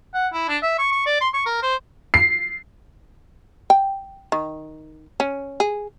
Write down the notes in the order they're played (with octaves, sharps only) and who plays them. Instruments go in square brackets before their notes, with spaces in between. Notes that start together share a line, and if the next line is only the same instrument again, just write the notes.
[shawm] F#5
E4
D4
E5
C#6
C#6
D5
C6
C#6
A#4
C5
[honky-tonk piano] C7
[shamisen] G5
D#3
C#4
G#4